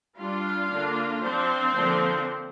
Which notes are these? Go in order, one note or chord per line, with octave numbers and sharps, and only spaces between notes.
G3 D4 F4 F5
D3 A#3 D4
F3 C4 D4 C5
D3 F3 A#3 D4